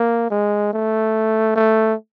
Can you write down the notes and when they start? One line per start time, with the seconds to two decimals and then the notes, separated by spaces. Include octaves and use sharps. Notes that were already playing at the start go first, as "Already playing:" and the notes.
Already playing: A#3
0.31 G#3
0.73 A3
1.56 A3